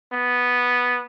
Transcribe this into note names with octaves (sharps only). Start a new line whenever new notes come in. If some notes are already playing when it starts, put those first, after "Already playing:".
B3